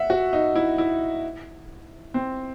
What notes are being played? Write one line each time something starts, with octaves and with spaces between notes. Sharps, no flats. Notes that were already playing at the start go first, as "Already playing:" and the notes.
Already playing: E5 F#5
F#4
D#4
E4
E4
C4